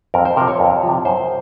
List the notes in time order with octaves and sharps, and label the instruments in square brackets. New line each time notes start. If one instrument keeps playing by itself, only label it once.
[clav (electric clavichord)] F2 A#4
C5
C3 F3 A#4
C#5
F2
C3 F3
F#2 C5